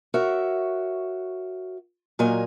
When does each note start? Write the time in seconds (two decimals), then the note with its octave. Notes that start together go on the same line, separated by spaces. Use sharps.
0.14 F#4 A#4 C#5 E5
2.19 A#2 F#3 A#4 D#5 G#5